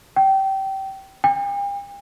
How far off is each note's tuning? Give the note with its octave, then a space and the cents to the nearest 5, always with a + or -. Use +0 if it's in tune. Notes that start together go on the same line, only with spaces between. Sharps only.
G5 -20
G5 +45